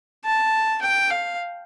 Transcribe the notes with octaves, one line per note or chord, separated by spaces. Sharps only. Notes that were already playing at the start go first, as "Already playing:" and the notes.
A5
G5
F5